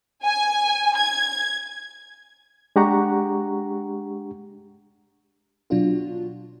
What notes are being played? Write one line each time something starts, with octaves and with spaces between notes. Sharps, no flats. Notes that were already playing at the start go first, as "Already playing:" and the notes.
G#5
G#6
G#3 D4 G4 F#5 A#5 C#6
B2 F#3 D4 F4 F#4